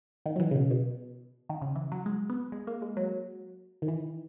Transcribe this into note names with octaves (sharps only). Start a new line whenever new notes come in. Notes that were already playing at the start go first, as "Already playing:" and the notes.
D#3
F#3
E3
C#3
B2
B2
D#3
C#3
E3
F#3
G#3
B3
G#3
A#3
G#3
F#3
D#3
E3